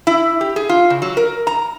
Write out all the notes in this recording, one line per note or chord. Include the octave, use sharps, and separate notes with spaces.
E4
G4
G#4
F4
C#3
F#3
A#4
A#5